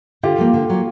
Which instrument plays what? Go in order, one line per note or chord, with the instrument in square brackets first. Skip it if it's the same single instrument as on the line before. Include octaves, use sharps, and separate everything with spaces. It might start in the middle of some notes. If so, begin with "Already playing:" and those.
[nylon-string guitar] D3 [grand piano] F4 G4
[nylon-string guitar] F3 A#3
D3
F#3 A#3